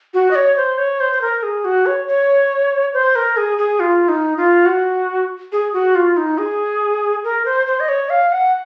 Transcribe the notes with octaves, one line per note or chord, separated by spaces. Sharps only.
F#4
D#5
C#5
C5
C#5
C5
C5
A#4
G#4
F#4
C#5
C#5
C5
A#4
G#4
G#4
F4
D#4
F4
F#4
G#4
F#4
F4
D#4
G#4
A#4
C5
C5
D#5
C#5
F5
F#5